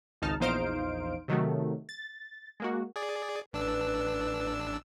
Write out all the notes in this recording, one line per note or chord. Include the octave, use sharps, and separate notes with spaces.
G#1 C#2 D#4 A5 F6
A#1 E2 D#4 C5 F5 D7
C3 D#3 F#3 A3
A6
G#3 A#3 F#4
G#4 D5
A1 D4 B4 E6